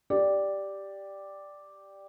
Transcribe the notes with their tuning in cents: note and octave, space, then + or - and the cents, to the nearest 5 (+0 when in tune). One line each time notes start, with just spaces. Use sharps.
G4 +0 D5 +0